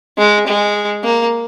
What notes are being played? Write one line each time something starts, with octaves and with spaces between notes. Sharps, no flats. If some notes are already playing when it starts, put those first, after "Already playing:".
G#3
G#3
A#3